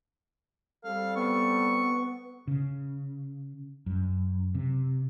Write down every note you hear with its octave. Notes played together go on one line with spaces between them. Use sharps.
G3 C4 A4 F5
B3 C#6
C#3
F#2
C3